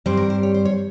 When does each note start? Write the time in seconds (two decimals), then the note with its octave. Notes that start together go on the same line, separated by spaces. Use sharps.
0.06 G2 G3 C4 C5
0.17 A#4
0.30 C5
0.43 C#5
0.54 C5
0.65 C#5